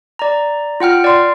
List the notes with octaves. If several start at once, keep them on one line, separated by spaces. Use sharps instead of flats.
D5 A#5
F4 F#5 G5 F6
D5 C6